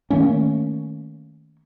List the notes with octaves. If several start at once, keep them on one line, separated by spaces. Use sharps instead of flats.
D#3 A3 A#3 C#4